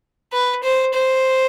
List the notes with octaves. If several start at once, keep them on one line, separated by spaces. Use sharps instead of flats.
B4
C5
C5